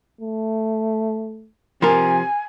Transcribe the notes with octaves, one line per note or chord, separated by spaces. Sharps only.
A3
C3 F3 A#4 G#5